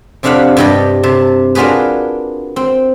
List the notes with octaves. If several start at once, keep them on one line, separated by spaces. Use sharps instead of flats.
F2 C3 D4 F5 F#5 B5
G2 C3 G3 G4 D#5
C3 A5
A#3 D4 F4 F#4 G#4 B4
C4